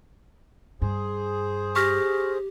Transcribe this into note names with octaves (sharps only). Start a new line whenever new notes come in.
G2 G#4 C5
G4 C#6 F6 A#6